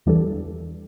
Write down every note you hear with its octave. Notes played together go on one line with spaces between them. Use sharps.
E2 E3 G3 D4 A4